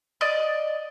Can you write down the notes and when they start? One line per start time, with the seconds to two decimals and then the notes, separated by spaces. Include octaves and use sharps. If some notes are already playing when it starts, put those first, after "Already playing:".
0.21 D5 D#5